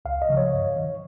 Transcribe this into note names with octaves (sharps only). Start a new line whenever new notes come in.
C#2 F5
D#5
C#3 F3
C#5
G2
D#3